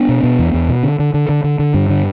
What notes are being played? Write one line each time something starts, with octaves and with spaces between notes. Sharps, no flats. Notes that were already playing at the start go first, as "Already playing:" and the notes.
Already playing: B3 D4
B2
B2
E2
E2
B2
D3
D3
D3
D3
D3
D3
G2
D3